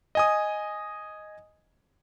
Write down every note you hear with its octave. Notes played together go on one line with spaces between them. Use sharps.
D#5 G#5 D#6